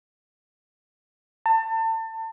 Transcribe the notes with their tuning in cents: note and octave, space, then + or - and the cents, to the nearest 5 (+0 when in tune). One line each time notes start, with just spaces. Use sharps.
A5 +35